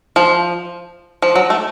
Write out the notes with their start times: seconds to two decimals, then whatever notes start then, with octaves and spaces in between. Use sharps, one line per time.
0.16 F3
1.22 F3
1.35 F#3
1.50 A3